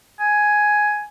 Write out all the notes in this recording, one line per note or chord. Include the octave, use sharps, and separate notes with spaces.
G#5